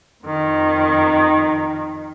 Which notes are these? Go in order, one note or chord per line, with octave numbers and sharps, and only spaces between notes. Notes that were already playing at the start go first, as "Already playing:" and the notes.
F2 D#3